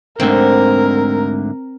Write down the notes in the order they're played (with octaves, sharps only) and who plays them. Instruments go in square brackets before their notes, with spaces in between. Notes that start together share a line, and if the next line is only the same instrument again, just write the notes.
[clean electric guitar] D2 G#2 D3 [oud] C4 [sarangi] A#4